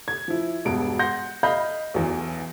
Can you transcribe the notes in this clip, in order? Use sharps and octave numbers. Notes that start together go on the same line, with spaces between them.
G#6
F3 E4
E1 G2 B2 D7
F#5 C6 G6 A#6
D#5 F5 B5 G6
B1 E2 E3